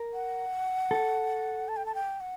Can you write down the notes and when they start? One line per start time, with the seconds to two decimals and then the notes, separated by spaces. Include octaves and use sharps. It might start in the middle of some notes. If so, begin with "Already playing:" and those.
Already playing: A#4
0.14 F#5
0.91 A4
1.68 A5
1.77 G5
1.86 A5
1.95 G5
2.20 F#5